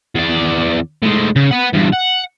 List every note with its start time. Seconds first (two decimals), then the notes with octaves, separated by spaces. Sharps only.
0.15 E2 D5
1.03 A2 G#3
1.36 C#3
1.51 B4 F#5
1.73 E2 G2
1.92 F#5